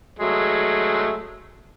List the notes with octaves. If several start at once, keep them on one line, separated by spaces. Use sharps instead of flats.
F#3 G#3 A3